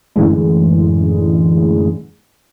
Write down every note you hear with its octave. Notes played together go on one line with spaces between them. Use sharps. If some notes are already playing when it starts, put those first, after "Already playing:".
F#2 A2 D3 E3 G#3